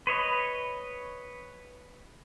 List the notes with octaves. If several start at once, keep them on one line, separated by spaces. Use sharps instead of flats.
B4 C#5 D#5